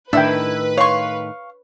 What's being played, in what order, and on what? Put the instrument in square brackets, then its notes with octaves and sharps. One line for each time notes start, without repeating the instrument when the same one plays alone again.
[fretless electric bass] A2 D#3 [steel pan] D4 E5 G5 [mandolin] E4 [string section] B4
[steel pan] C#5 C6 [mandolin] F5 C#6